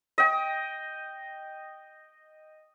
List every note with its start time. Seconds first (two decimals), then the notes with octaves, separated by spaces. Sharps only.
0.18 D#5 G5